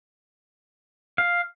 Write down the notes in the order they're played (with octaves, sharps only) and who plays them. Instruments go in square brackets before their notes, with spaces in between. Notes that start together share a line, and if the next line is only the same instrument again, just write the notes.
[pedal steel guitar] F5